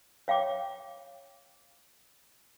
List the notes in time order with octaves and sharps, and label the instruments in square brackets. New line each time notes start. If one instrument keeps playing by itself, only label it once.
[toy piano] C#5 F5 G5 D6